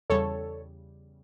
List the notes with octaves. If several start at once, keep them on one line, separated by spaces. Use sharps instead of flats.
E2 C#3 G3 A4 C#5